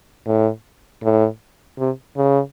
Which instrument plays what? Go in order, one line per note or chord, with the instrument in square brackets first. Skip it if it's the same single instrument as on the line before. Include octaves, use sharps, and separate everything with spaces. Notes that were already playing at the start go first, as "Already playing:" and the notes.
[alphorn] A2
A2
C3
C#3